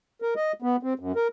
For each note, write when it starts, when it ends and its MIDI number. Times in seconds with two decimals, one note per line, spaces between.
0.22 0.34 70
0.36 0.52 75
0.62 0.76 59
0.83 0.93 60
0.99 1.12 42
1.15 1.28 70